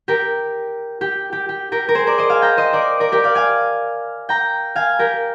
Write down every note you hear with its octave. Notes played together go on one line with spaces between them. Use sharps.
G4 A#4
G4
G4
G4
G4 A#4
A#4
G#4 C5
A#4 D5
C5 D#5
F5 G#5
G5 A#5
C5 D#5
A#4 D5
A#4 D5
G4 A#4
D5 F5
F5 G#5
G5 A#5
F5 G#5
G4 A#4